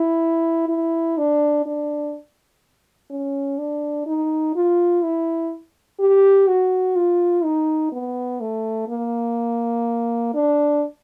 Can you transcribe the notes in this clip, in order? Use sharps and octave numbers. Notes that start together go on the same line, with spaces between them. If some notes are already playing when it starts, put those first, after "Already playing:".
Already playing: E4
E4
D4
D4
C#4
D4
D#4
F4
E4
G4
F#4
F4
D#4
B3
A3
A#3
D4